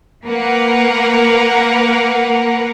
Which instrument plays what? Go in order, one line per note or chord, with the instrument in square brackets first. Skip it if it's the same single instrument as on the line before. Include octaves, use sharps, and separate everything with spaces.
[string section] A#3 A#4 B4 F#5